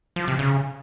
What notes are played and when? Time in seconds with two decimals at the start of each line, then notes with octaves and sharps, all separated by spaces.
0.16 F3
0.28 C3
0.39 C#3